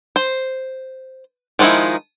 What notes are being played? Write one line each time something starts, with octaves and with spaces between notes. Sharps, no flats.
C5
D#3 F3 G#3 D#4 E4